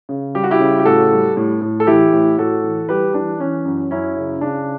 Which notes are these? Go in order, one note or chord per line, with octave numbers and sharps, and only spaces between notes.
C#3
G3 G4
F#4
E4 G4
C#3
G4
A2 F#4 A4
G3
A2
A2
A4
E3 E4 G4
A2
A2 F#4 A4
E3
G3 G4 B4
E3 D4
E3 C#4
F#2
F#2 C#4 E4
C#3
C#3 D4